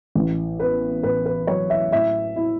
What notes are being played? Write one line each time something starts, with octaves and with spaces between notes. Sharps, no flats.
A1
B3 B4
A2 B4
B4
F#3 C#5
E5
A2 E5
E4